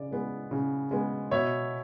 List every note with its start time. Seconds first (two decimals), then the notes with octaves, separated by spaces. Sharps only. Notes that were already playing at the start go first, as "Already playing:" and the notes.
Already playing: C#3 D5
0.11 G#3 B3
0.51 C#3
0.91 G#3 B3
1.31 B2 C#5 E5